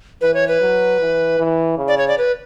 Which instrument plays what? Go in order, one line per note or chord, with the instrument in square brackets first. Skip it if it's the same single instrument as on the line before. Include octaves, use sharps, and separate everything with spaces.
[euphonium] E3 [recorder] B4
[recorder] C#5
B4
[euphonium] F#3
E3
E3
C#3
[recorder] D5
C#5
D5
B4